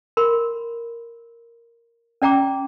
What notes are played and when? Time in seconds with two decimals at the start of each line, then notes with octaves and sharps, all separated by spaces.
0.17 A#4 B5 C6
2.22 C#4 D5 G5 A#5 D6